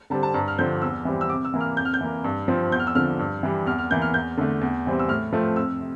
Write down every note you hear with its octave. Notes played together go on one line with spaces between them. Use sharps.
D3 G3 C4 A5
A5
G2 A#5
F6
D3 F3 C4 G6
E2 E6
E3 G3 C4
E6
C3 D6
E6
E3 A#3
F6
F2 G6
F6
G6
E3 A#3
G2
F3 C4
E2 G6
F6
E6
D3 F3 F6
G2
E3 G3
E2 F6
F6
E3 A#3 G6
F6
E2 G6
D3 A3
E2
C3 E3 G3 C4
E6
A2 F6
F3 A3 C4
F2 E6
C3